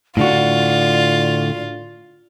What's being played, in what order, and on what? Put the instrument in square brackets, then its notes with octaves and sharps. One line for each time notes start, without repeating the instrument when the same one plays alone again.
[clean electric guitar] A2 D3 F#4 [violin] F4 [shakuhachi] D5